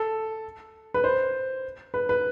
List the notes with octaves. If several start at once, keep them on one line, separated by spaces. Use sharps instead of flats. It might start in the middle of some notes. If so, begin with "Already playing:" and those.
Already playing: A4
B4
C5
B4
B4